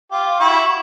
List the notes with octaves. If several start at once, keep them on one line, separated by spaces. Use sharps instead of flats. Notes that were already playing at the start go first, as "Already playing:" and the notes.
F4 G4
E4 F#4